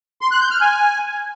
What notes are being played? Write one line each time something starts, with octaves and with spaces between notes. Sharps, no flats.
C6
F#6
G6
F6
G#5